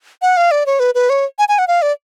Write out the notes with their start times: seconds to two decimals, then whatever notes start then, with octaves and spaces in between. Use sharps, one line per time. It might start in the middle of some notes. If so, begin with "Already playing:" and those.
0.22 F#5
0.37 F5
0.51 D5
0.66 C#5
0.80 B4
0.95 B4
1.10 C#5
1.39 G#5
1.49 G#5
1.59 F#5
1.68 F5
1.82 D5